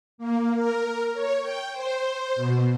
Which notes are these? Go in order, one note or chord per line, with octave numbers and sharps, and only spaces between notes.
A#3
A#4
C#5
G5
C5
B2